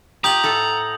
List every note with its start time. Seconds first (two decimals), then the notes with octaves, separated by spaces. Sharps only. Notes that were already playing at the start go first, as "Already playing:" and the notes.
0.24 F4 G4 A#5 D#6 G6 F#7
0.43 A2 A4 F#5